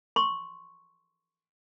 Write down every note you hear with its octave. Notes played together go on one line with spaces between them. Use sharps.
C6 C#6